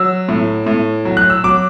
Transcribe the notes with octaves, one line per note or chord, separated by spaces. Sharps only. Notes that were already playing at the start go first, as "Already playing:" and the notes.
Already playing: F#3 E6
A2
A2
F#3
F#6
E6
F#3 D6